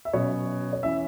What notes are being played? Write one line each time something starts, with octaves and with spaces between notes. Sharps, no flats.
E5
B2 F#3 C#4 C#5
C#5
E3 C#4 E5